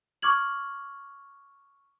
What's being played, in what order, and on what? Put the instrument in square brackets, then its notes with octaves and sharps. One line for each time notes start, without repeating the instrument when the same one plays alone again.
[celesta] C#6 D6 F6 G#6 F#7